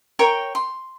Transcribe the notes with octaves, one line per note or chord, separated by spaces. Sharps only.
A#4 C#5 G5
C6